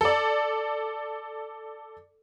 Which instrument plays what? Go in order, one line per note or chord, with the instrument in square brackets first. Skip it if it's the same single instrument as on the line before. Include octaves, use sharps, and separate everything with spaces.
[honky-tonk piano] A4 D5